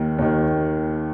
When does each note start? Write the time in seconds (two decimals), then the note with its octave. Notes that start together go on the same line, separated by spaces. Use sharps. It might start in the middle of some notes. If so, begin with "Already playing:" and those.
Already playing: D#2 D#3
0.18 D#2 D#3